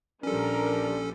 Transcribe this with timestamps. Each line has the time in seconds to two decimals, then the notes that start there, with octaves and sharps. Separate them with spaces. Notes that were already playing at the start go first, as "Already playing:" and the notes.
0.23 A#1 F3 G3 C#4 D4 A4 A#4